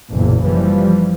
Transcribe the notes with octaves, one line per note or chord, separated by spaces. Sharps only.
F#1 B1 E2 A#2
E3 F3 G3